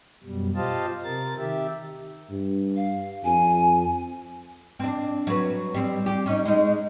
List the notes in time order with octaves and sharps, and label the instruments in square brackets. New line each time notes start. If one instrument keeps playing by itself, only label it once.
[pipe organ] F#2 B2 G3
F4 G4 C5 D#5 F5 A5
C3 A#4 A6
D#3 G4 E5
[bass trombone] G2
[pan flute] F5
[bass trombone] F2 [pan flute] G#5
[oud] C4 D4
F#3 B4
G3 C4
G4
C#4 D#4
G#3 D#4